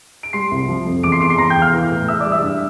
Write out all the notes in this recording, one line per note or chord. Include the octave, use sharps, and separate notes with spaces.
D7
G3 C6 C7
C2
F3
F2
E2 D6 D7
C6 C7
E2 D6 D7
C6 C7
E2 A#5 A#6
G5 G6
E2
F5 F6
E3
A2
E3 E5 E6
D5 D6
G3
E5 E6
G2